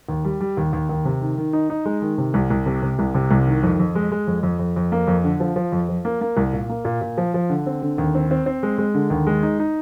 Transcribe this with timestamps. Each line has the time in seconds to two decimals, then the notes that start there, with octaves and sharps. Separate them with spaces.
0.09 D#2
0.24 G3
0.40 G3
0.57 D#2
0.73 D#2
0.89 D#2
1.05 C3
1.21 D#3
1.38 D#3
1.53 D#4
1.70 D#4
1.85 G#3
2.02 D#3
2.18 C3
2.34 C2
2.50 C2
2.66 C3
2.82 C3
2.99 C2
3.15 C3
3.31 C2
3.46 D#3
3.63 F2
3.79 F2
3.95 G#3
4.12 G#3
4.27 F2
4.43 F2
4.59 F2
4.76 F2
4.92 A#3
5.07 F2
5.24 D3
5.40 F3
5.56 F3
5.72 F2
5.89 F3
6.05 A#3
6.21 A#3
6.37 C2
6.53 A#2
6.70 A#3
6.85 A#2
7.01 A#2
7.18 F3
7.34 F3
7.50 D3
7.66 C4
7.82 D3
7.98 D#2
8.15 C4
8.31 C4
8.46 C4
8.63 G#3
8.78 G#3
8.94 D3
9.10 D#2
9.27 G#3
9.43 D#4
9.60 D#4